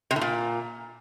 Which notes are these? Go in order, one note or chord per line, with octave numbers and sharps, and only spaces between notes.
C3
A2
A#2